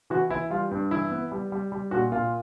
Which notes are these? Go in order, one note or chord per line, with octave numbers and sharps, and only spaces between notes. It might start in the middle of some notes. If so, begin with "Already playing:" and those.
E3 F#4
E3 E4
G3 F4
G2
E3 E4
B3
G3
G3
G3
A#2 F#4
A#2 F4